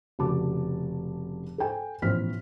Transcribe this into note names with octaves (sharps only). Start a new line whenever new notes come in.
F1 C#3 F#4 A5 D6
A4 C5 G5 G#5
A1 B2 F3 C5 F6 B6